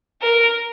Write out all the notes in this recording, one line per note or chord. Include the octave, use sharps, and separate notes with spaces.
A#4